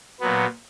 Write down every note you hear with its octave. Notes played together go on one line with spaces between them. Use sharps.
A#2 F#3 B3